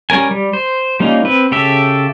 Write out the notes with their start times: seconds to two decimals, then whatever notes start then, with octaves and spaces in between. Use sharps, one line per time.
0.10 G3 C#4 A#4 G#5
0.31 G3
0.53 C5
1.00 G3 A#3 C#4 D#4 F4
1.25 C4 B4
1.52 C#3 G4 A4 E5